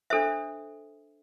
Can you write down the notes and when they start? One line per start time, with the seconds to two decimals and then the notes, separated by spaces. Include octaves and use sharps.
0.10 D4 A4 C5 E5